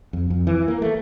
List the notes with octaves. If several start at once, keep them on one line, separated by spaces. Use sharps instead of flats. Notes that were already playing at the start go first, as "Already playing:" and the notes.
F2
F2
E3
A#3
A3